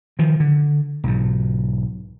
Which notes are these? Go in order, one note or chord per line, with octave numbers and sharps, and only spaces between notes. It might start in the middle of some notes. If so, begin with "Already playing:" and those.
D#3 F3
D3
B1 G#2